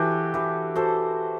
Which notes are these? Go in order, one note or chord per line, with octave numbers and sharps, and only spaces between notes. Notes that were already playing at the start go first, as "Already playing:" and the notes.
Already playing: E3 F#4 G4 A4 B4
E3 G4 B4
F#4 A4 C5